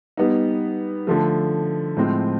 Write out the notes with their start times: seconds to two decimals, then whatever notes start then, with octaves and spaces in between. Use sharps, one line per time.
0.17 G3 B3 D#4
1.07 D3 F3 A3
1.97 A2 F3 G#3 C4